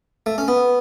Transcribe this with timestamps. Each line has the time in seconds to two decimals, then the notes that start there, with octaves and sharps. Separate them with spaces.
0.26 A3
0.38 C#4
0.48 B3